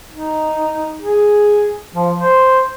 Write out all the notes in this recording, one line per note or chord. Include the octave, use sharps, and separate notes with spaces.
D#4
G#4
F3
C5